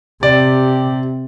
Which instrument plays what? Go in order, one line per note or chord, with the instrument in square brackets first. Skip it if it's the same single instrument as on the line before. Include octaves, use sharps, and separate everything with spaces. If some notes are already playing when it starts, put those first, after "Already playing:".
[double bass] C3 [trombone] G4 [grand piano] D5